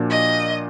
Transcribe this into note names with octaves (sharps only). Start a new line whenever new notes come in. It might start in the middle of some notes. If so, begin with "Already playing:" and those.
Already playing: A#2 F3 A#3 D4 F#4
D#5